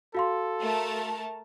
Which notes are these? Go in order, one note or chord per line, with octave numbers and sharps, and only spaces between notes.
F#4 A4 F5 C6
A3 A#4 A5